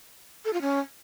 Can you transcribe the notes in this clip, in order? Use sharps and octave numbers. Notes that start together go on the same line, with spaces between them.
A4
F4
C#4